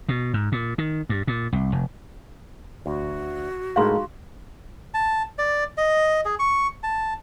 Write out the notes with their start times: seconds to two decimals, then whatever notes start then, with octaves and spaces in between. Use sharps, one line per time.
0.09 B2
0.34 G#2
0.52 A#2
0.78 D#3
1.09 G2
1.27 A#2
1.53 C2
1.72 F1
2.86 D2 F#4
3.76 A2 G#3 D#4 G#4 A#4 F5 F#5 C6
4.94 A5
5.38 D5
5.77 D#5
6.25 G#4
6.39 C#6
6.83 A5